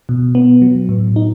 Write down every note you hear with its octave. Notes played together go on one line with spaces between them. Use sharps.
B2
B3
F#3
A2
D#4